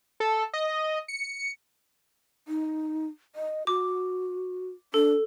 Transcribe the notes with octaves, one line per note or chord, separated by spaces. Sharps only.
A4
D#5
C#7
D#4
D#5
F#4 D6
D4 A4